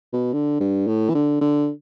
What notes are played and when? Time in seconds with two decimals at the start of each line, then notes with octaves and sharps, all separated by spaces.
0.13 B2
0.33 D3
0.60 G2
0.87 A2
1.10 E3
1.15 D3
1.41 D3